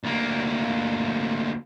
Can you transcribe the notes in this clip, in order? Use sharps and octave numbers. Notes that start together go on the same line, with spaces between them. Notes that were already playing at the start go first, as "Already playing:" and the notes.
D2 A#3